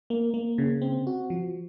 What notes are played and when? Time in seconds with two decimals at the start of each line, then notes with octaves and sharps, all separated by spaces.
0.10 A#3
0.34 A#3
0.58 C#3
0.82 C4
1.07 F#4
1.30 F3